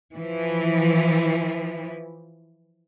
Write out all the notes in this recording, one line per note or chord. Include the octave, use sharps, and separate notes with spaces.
E3 F3